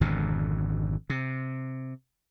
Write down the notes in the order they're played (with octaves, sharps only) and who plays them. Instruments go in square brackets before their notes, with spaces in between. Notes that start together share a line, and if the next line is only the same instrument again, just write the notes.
[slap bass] G#1 F2 B2 D3
C3